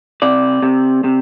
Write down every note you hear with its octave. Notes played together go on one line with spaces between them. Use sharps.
C3 D5
C3
C3